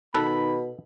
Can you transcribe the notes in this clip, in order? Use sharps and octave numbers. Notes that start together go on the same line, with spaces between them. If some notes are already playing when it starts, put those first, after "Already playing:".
B2 D#3 A4 B4 B5